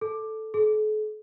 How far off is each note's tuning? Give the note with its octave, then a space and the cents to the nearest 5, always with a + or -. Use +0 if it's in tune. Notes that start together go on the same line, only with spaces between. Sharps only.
A4 -5
A4 -45